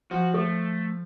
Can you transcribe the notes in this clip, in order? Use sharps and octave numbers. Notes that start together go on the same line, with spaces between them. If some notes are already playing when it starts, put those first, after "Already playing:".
F3 F#4
A3 A4